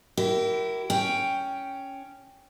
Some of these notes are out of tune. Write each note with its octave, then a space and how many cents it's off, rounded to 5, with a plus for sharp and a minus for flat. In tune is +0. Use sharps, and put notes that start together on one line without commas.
E4 +15 G4 -40 A#4 +0
C#4 +5 G5 +0